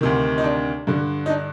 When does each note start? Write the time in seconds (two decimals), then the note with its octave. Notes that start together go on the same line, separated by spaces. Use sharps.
0.01 D2 C3 D#3
0.38 D#4
0.44 D4
0.87 G2 D3
1.26 D#4
1.30 D4